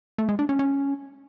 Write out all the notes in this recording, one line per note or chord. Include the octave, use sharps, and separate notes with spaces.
A3
G#3
D4
C#4
C#4